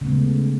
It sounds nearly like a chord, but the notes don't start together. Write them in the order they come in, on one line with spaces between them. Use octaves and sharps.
C#3 A3 B3 G#3